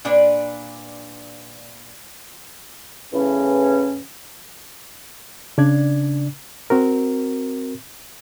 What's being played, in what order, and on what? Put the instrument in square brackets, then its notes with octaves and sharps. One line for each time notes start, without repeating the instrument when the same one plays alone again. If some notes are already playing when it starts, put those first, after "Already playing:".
[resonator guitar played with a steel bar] A#2 D4 B4 D5
[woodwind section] E2 A2 C#3 E3 C#4
[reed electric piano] C#3 D4 D5 G#6
C4 F#4 A#4